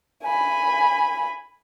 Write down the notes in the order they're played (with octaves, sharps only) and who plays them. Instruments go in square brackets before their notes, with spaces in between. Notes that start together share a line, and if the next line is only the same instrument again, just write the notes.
[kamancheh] G#5 B5